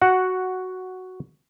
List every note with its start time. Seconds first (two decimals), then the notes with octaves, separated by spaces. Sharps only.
0.02 F#4 F#5